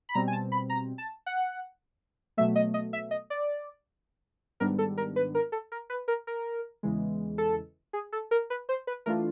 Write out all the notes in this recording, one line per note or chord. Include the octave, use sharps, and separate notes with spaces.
B5
B2 G3 C4 A#5
G#5
A5
B5
A#5
A5
F#5
B2 F#3 A3 E5
D#5
D#5
E5
D#5
D5
G#2 D#3 G3 B3 D4 A#4
A4
A#4
B4
A#4
A4
A#4
B4
A#4
A#4
E2 C#3 E3 G#3
A4
G#4
A4
A#4
B4
C5
B4
E3 A3 D4 F4 A#4